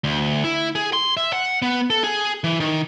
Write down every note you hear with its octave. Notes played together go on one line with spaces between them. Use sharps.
D2
E4
G#4
C6
E5
F#5
B3
A4
G#4
E3
D#3